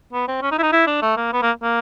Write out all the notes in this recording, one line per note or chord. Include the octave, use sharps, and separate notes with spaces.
B3
C4
C#4
D#4
E4
D#4
E4
D4
A3
A#3
B3
A#3
A#3